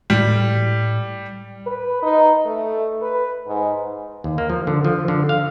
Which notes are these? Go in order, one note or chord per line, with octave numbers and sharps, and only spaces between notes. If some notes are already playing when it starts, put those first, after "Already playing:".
A2 G3
B4
D#4
A3
B4
G#2
D#2
A#3
F3
D3
F3
D3
F5